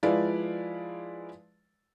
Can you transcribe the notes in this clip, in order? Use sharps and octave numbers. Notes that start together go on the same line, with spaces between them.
F3 G#3 E4 B4 D5 F5